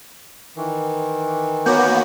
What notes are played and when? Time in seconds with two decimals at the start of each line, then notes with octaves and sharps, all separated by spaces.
0.56 D#3 E3
1.66 A#3 B3 F#4 C#5 D6 G6